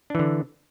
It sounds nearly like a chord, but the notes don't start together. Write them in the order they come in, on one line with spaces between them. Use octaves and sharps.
D4 E3 D3